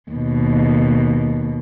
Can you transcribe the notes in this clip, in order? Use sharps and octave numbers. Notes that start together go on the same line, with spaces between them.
D#2 B2